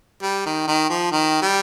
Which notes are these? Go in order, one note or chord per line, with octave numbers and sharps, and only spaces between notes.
G3
D#3
D#3
F3
D#3
G3